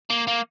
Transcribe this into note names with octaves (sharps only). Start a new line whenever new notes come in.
A#3
A#3